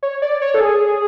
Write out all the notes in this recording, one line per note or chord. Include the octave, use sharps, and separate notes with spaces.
C#5
D5
C#5
A4
G#4